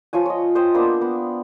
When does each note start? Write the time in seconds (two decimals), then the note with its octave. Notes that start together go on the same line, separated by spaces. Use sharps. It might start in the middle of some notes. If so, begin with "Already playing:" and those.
0.13 F3 F4 C#5 G#5
0.26 C#5 D#5
0.55 C5 D#5 G5
0.74 A#3 B3 D4 C5
1.01 B3